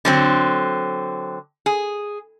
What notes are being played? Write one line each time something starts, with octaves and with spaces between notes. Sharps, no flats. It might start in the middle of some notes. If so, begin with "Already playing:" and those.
D3 F#3 C4
G#4